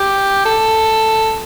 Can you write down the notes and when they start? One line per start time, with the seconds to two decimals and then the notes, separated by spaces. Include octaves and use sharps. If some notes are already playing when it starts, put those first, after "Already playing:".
Already playing: G4
0.45 A4